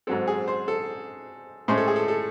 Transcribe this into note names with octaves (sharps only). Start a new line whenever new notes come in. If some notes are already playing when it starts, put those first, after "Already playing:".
G#2 F#3 C4 A4
G#4
C5
A4
A2 G#3 C#4 C5
A4
G#4
A4
A4